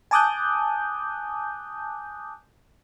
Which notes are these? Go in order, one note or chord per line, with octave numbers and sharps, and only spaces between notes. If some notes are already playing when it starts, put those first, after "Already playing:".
G#5 A5 D6 D#6 F#6 G6